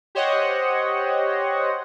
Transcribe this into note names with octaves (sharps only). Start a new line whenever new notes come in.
G4 C5 C#5 D#5 F#5